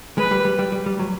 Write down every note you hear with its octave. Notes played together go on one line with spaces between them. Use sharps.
G#3 B4
G3
G3
G3
G3
G3
F#3